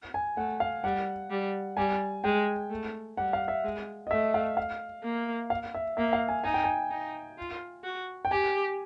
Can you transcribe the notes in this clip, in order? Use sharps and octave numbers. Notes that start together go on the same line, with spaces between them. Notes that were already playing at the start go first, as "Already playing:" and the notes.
G#5
A3 F#5
F5
G3 F#5
G3
G3 G#5
G#3 G5
A3
G3 F#5
F5
E5
G#3
D#5
A3 E5
F5
F5
A#3
F5
E5
A#3 E5
F5
G#5
D#4 G#5
G5
G#5
D#4
F4
F#4
G5
G4 G#5